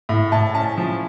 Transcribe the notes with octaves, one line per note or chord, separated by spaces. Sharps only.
A2
A2 A5
C#4 A5
F3